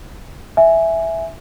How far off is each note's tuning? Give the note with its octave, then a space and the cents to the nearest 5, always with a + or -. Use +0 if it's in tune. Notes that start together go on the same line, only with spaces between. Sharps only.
E5 +0 G#5 +0